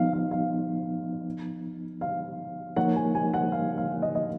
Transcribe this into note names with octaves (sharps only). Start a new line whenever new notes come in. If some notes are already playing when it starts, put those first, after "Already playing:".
Already playing: F3 B3 D#4 F5
F5
F5
F5
F3 A#3 D#4 A#4 C#5 F#5
G#5
G#5
F#5
F5
F5
D#5
D#5